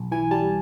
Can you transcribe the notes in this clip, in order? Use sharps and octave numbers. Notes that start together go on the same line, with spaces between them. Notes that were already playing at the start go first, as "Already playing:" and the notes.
Already playing: B1
E3 G#5
G3 A5